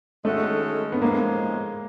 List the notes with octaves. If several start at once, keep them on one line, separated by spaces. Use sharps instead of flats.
D#3 G#3 A3 C#4 F#4 A4
B3
A2 F3 G#3 A#3